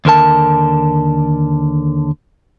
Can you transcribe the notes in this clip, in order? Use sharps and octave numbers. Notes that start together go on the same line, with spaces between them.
D#2 D3 A#4 A5